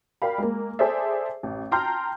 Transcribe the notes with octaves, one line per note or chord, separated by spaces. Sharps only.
A#4 D5 F5 G5 B5
G#3 A#3
G#4 A4 C5 D5 E5
A1
G5 A5 A#5 C6 F6 G6